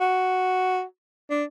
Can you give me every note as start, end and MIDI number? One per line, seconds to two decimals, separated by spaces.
0.01 0.83 66
1.30 1.44 62